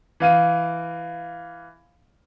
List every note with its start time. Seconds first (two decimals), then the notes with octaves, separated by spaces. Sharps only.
0.20 E3 F5 D#7